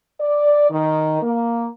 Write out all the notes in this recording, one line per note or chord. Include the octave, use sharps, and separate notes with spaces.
D5
D#3
A#3